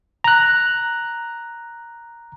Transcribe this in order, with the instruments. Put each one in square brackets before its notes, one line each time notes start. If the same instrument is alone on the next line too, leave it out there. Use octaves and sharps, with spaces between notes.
[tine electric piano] A#5 F#6